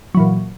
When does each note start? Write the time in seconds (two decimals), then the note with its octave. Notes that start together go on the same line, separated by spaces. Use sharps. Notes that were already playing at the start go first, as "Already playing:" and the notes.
0.15 F#3
0.17 E3
0.20 A#2